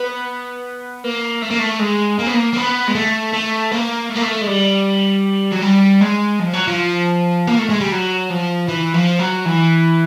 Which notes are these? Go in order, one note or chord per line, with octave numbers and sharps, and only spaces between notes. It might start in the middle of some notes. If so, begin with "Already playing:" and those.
Already playing: B3
A#3
A3
A#3
A3
G#3
A#3
B3
A#3
A#3
B3
G#3
A3
A3
A#3
A3
A#3
A3
G#3
G3
F#3
G3
G#3
F3
F#3
F3
A#3
A3
G#3
G3
F#3
F3
E3
F3
F#3
E3